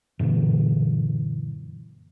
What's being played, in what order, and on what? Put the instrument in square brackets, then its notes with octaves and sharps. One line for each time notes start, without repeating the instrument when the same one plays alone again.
[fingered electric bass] F#2 A#2 D3 E3